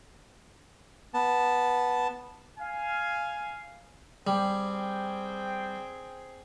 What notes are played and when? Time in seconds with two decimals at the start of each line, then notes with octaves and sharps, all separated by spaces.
1.14 B3 A5
2.59 F5 G#5
4.27 G3 C4 G#4 G5